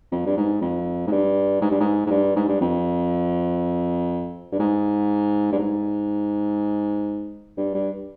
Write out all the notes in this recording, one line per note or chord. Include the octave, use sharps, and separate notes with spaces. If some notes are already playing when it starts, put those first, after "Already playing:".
F2
G2
G#2
F2
G#2
G2
G#2
G2
G#2
G#2
G2
G#2
G2
F2
G2
G#2
G2
G#2
G2
G2